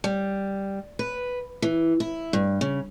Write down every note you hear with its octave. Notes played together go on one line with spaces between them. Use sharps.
G3
B4
E3
E4
G2
C#3